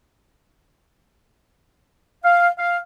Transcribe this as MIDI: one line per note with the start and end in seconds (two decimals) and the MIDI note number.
2.24 2.48 77
2.59 2.77 77